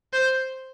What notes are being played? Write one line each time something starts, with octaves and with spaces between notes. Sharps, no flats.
C5